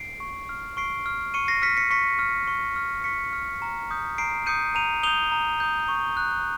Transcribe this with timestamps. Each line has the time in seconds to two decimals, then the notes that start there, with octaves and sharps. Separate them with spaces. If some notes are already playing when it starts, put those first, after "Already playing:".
Already playing: C7 D7
0.20 C#6
0.49 F6
0.77 C#6 C7 D7
1.06 F6
1.34 C#6 C#7 D#7
1.48 A#6 C7
1.62 F6 B6 C#7
1.77 B6 C#7
1.90 C#6 B6 C#7
2.19 F6
2.48 C#6
2.76 F6
3.04 C#6 B6 C#7
3.33 F6
3.62 A#5
3.91 D#6 G6
4.18 A#5 C7 D7
4.46 D#6 G6 C#7 D#7
4.75 A#5 D#7 F7
5.03 D#6 G6 F7 G7
5.32 A#5
5.60 D#6 G6
5.88 C#6
6.17 F#6